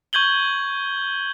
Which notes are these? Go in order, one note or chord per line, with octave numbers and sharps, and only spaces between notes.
C#6 G6 G#6 F#7 G7